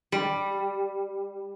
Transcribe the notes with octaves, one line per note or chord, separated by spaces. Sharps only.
G3